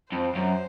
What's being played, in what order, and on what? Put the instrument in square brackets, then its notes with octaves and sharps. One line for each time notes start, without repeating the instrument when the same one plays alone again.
[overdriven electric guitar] F2 [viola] C5
[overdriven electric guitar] F#2